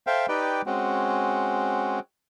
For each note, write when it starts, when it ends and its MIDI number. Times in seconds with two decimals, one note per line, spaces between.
0.07 0.26 69
0.07 0.26 72
0.07 0.26 76
0.07 0.26 77
0.07 0.26 79
0.29 0.62 63
0.29 0.62 67
0.29 0.62 71
0.29 0.62 74
0.29 0.62 79
0.66 1.99 56
0.66 1.99 60
0.66 1.99 61
0.66 1.99 66